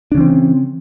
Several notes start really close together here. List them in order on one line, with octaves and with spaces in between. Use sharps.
D4 C#3 E3 C4